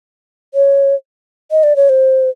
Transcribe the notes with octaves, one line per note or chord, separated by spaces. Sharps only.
C#5
D#5
D5
C#5
C5